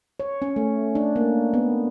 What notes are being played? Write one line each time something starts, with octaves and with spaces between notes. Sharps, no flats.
C#5
C#4
A3
D4
A#3
B3